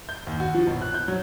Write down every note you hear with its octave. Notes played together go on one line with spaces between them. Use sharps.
G6
D#2
F#4
F3
B1
F#6
G6
F#3